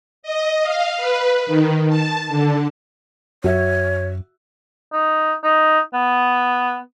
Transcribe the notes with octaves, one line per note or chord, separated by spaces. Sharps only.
D#5
F5
B4
D#3
A5
D3
F#2 F#4 C#5 E5
D#4
D#4
B3